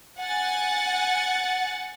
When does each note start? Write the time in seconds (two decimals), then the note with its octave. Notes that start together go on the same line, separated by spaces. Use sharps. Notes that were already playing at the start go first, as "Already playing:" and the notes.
0.18 F#5 G#5 A6